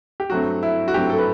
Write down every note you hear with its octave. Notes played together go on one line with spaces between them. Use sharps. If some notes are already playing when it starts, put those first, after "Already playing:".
G4
G2 F#3 A3 C4 F#4
E4
F#4
G2 F#3 A3 C4 G4
A4
B4